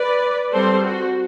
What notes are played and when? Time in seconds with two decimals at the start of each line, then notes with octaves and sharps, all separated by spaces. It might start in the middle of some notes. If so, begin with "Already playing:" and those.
Already playing: B4 D5
0.52 G3 C4 A4 C5
0.84 F#4